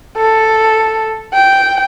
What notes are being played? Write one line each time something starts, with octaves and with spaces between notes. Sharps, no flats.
A4
G5